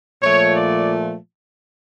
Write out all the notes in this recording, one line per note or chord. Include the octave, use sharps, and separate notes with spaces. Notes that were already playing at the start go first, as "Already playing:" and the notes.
A#2 F3 A3 C#5
D5